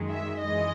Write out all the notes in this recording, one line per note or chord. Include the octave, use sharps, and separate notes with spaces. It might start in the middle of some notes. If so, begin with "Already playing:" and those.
Already playing: F#2 D#3 G#3
E5
F#2 E3 G#3 D#5